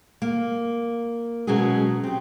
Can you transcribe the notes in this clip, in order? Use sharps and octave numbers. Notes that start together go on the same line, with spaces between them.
A#3
B2 F#3 G#3 C#4 F#4 G#4
C4 G4